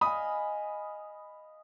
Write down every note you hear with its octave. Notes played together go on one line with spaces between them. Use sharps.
D#5 F5 G#5 B5 D#6